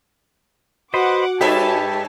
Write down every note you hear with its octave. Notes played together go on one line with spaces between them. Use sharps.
F#4 B4 C5 D#5 F#5 D6
G2 G4 A4 B4 C#5 E5 G#5 A5